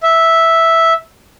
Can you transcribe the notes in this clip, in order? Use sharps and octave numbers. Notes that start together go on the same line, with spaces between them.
E5